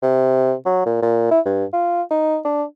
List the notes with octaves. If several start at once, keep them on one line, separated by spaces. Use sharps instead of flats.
C3
F#3
A#2
A#2
E4
G2
F4
D#4
D4